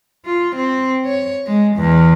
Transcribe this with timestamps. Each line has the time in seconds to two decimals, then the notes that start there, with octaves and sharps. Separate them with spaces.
0.26 F4
0.55 C4
1.05 C#5
1.47 G#3
1.76 E2